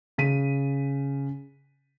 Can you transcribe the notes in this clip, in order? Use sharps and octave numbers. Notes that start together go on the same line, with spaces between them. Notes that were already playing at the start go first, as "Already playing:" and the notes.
C#3 B6 D#7